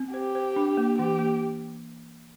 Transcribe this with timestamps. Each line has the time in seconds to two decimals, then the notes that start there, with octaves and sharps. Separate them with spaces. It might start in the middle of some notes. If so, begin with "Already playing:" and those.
Already playing: C4
0.14 G4 C5
0.35 C5
0.56 D4
0.77 A#3
0.99 E3 G4
1.19 A#3